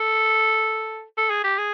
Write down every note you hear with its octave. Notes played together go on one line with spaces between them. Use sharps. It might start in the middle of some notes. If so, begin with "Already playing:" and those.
Already playing: A4
A4
G#4
G4
G#4